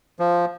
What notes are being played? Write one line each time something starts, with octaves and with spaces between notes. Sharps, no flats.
F3